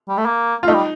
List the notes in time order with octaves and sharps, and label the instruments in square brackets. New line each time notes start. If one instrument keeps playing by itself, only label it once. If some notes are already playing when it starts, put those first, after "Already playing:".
[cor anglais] G3
A3
A#3
[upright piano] F4
[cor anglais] A3 [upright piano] D#4
[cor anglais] G3